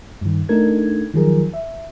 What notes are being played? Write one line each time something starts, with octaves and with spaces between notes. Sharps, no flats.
G2 D#3
A3 D4 D#4 A4 A#4 G#6
D#3 F3 F#3 G#4 A#4
E5